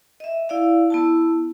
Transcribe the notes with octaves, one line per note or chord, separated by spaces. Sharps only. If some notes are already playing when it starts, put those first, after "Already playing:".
D#5 E5
E4 D5 F5
B3 E4 A5